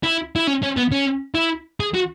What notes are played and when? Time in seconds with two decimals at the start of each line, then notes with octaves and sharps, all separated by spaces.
0.03 E4
0.36 E4
0.47 C#4
0.63 C#4
0.77 B3
0.91 C#4
1.35 E4
1.80 G#4
1.94 F#4